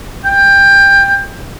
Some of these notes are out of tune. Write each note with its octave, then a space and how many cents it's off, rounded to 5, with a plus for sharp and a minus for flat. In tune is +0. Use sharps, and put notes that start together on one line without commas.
G5 +20